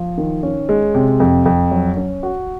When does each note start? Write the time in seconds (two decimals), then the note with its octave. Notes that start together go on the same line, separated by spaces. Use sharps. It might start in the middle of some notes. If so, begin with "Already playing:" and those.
Already playing: F3
0.18 D#3
0.43 C#4
0.69 G#3
0.94 C3
1.20 F2
1.46 F2
1.71 F#3
1.97 C#4
2.23 F#4